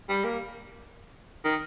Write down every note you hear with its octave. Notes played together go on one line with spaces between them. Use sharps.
G3
A#3
D#3